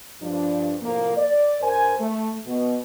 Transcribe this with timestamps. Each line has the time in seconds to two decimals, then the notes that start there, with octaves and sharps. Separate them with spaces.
0.22 G2 F3 D4
0.82 A2 C3 F3 A3 A#3
1.17 D5
1.62 G2 A#4 C5 G#5
2.00 A3
2.46 B2